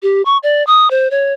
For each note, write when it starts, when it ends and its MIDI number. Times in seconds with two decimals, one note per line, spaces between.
0.03 0.22 67
0.25 0.38 85
0.43 0.65 74
0.67 0.90 87
0.91 1.10 72
1.11 1.33 73